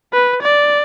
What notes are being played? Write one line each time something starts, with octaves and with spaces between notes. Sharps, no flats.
B4
D5